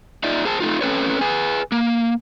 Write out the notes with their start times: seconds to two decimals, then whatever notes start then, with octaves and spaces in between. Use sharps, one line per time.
0.24 D#4 F4 D5 E5
0.45 G#4 C5 A5
0.60 A3 D#4 F4
0.81 C4 C#4 A4 B4 C#5
1.21 G#4 B4 G#5
1.72 A#3